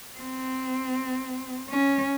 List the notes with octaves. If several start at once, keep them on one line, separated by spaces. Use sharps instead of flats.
C4
C#4